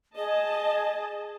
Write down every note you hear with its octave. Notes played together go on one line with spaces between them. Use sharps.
G#4 D#5 A5